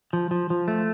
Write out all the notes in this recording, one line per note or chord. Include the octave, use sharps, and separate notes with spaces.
F3
F3
F3
A3